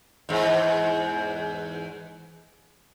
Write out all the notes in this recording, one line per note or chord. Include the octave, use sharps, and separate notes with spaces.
E2 G#2